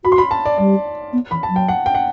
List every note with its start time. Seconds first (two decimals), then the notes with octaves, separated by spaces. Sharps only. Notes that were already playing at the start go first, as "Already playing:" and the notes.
0.05 F#4 B5
0.12 C6
0.18 B5
0.31 A5
0.45 D5
0.58 G3 D5
1.13 B3
1.31 E3 B5
1.43 A5
1.49 F#3
1.56 G5
1.68 F#5
1.86 G5
1.95 F#5